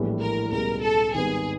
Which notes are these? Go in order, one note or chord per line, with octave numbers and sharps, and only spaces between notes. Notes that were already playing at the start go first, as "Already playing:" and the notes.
Already playing: A#1 A2 E3 G3 B3
A#4
C#2 B2 G3 A#4
A4
G#1 G#2 D#3 G3 B3 G#4